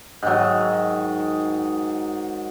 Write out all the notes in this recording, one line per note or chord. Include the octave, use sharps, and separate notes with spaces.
G#2 D#3 F#3